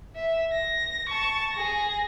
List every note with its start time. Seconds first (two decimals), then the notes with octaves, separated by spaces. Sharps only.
0.16 E5
0.53 A#6
1.09 A5 C#6
1.53 G#4 A#6